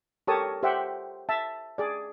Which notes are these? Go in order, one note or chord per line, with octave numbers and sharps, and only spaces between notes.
G4 A4 A#4 C#5 A5 D#6
G4 C5 E5 F#5 G5
E5 A5
G#4 D5